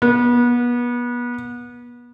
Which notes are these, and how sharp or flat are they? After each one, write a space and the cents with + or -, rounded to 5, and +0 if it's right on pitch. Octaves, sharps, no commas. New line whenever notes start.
B3 -30